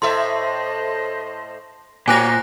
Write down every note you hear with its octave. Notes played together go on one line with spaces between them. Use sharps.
A2 A4 C5 D#5 E5 A5 C6
A#2 F#4 A#4 C5 C#5 G#5 F#6 A#6